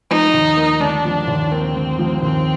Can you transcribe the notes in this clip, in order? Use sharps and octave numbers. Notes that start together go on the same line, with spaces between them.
F3 D#4
D#2
A#3
D3 D4
F3
D#2
A#3 C4
D3
F3
D#2 C4